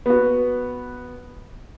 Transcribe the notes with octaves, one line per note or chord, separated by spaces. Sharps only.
B3 F#4